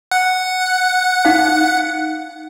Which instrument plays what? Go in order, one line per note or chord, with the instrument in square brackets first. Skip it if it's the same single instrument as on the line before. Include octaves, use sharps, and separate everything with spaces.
[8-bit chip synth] F#5
[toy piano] D#4 F5